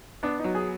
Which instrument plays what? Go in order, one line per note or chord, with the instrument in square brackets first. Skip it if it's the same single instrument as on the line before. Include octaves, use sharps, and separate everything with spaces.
[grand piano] B3 D4
F#3 D#4
G#4